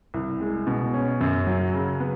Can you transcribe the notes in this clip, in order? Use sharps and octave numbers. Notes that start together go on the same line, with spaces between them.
C2
G#3
B2
C#4
F#2
F#3
C#3
B3